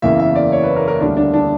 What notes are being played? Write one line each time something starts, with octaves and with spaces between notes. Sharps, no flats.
F#1 E2 C#3 E3 A#3 E5
E5
D5
C#5
B4
A#4
A#4
E1 D2 D3 G3 A#3 D4
D4
D4